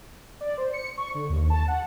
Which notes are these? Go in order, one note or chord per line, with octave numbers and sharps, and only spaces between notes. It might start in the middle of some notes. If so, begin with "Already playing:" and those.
D5
C5
C#7
C#6
D3
D#2
A5
F#5